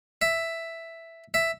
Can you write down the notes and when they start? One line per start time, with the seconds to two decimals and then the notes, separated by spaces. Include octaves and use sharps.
0.22 E5
1.34 E5